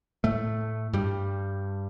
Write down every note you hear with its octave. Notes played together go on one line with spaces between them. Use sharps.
A2 A3
G2 G3